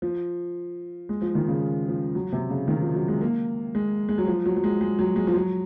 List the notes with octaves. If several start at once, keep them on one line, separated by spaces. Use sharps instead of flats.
F3
G#3
F3
D#3
C#3
F3
F#3
C3
C#3
D#3
F3
F#3
G#3
A#3
G#3
G#3
F#3
F3
F#3
F#3
G#3
G#3
F#3
G#3
F3
F#3